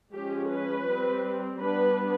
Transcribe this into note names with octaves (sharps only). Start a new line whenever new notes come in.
F3 G#3 C#4 G4
B4
G3 C4
G3 B3 D4 B4